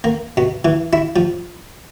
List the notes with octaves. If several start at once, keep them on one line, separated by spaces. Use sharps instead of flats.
A#3
B2
E3
E4
F3